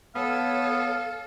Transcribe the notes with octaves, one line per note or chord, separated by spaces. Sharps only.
B3 A4 C#5 F5